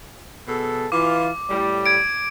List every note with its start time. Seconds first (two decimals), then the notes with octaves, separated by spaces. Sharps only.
0.48 B2 G#4 A4
0.92 E3 F4 D6
1.50 A2 G3
1.86 G#6 D7